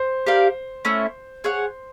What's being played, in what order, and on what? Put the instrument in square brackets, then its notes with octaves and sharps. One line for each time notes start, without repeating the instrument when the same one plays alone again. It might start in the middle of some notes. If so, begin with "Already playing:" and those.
Already playing: [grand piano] C5
[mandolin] G4 A#4 D5 F5
A3 C#4 E4
G#4 C#5 F#5